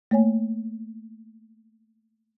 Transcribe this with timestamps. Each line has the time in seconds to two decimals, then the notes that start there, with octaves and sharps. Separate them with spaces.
0.11 A3 A#3 C#5 G#5